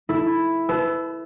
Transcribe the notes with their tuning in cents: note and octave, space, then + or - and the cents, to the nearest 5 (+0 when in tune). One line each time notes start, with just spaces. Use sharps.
E4 +0 A4 +0
B4 +30 A5 -35 E6 +5